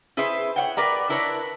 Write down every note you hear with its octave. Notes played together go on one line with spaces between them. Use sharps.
E4 G#4 B4 C5 E5
C#5 F#5 G5
A#4 B4 D5 A#5
D4 E4 A#4 B4 C#5